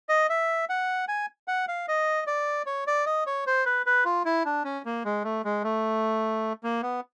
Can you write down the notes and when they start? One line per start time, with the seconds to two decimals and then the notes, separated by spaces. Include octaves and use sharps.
0.09 D#5
0.29 E5
0.69 F#5
1.08 G#5
1.48 F#5
1.68 F5
1.88 D#5
2.27 D5
2.66 C#5
2.87 D5
3.06 D#5
3.26 C#5
3.47 C5
3.66 B4
3.86 B4
4.05 F4
4.25 E4
4.45 D4
4.64 C#4
4.85 A#3
5.05 G#3
5.24 A3
5.45 G#3
5.64 A3
6.64 A#3
6.83 B3